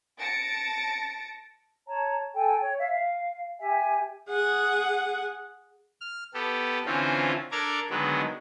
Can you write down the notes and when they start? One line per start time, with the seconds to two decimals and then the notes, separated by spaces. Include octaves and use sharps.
0.18 A5 A6 A#6 C#7 D7
1.87 C#5 A5 A#5
2.34 A4 G5 G#5
2.62 C#5
2.79 E5 F5
2.92 F5
3.60 G4 E5 G#5
4.28 G#4 F#5
6.01 F6
6.34 B3 G4 A4
6.86 D3 E3 C4 C#4 F4 C5
7.51 D4 A4 A#4 A#5 D6 G#6
7.90 D3 D#3 F#3 G#3 B3